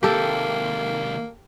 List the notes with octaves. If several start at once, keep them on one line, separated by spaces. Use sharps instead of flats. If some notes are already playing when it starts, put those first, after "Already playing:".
D#2 C3 A#3 G4 A4